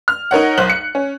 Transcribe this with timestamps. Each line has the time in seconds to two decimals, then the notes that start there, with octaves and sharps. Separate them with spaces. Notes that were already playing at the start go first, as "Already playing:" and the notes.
0.08 F6
0.31 D#4 A#4 C#5 F#5
0.58 B1 C5 F#6 F#7
0.70 C#7
0.95 C#4